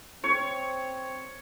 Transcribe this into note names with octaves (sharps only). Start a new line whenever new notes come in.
C4 C#5